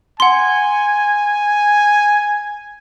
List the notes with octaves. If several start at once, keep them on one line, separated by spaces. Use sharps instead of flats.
F#5 G#5 C6